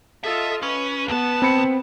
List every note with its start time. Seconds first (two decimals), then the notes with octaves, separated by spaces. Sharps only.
0.24 F4 A4 D#5 E5
0.63 C#4 B4
1.08 C#2 B3 A5
1.42 C4 B5 C#7